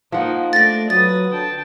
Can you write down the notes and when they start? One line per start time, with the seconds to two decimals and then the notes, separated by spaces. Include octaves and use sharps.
0.12 F3 A#3 D#4 F#5
0.53 A3 D4 D5 A6 A#6
0.90 F#3 B4 D#6 A6
1.32 D3 G5 A5